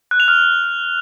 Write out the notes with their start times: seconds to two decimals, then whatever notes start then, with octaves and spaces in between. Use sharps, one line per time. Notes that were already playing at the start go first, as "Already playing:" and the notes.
0.11 F#6
0.20 F7
0.28 F6